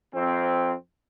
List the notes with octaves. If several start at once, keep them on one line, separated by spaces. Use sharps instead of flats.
F2 C4